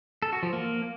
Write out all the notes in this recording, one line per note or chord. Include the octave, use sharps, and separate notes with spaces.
A4
F#4
F3
A#3